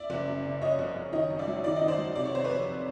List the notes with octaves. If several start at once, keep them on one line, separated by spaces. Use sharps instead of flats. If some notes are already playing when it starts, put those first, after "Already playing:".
Already playing: D5 E5
F#1
F#2
C#3
F#1 C#5 D#5
F#1
F#1
D#3 C#5 D#5
F#2
D5 E5
F#3
D#3 D5
D#5
D#3
C5 D5
F#3
C3 D5
C#5
C3 C5
B4 C#5
F2